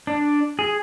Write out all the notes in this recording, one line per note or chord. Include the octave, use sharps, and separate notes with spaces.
D4
G#4